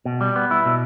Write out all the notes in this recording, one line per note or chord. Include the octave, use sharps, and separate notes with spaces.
B2
G3
B3
E4
B2